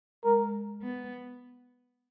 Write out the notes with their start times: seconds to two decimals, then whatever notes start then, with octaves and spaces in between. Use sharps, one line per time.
0.24 G#3 A#4
0.83 B3